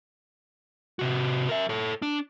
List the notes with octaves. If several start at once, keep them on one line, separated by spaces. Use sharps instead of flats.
C3 F#4
A#4 E5
A4 C#5
D4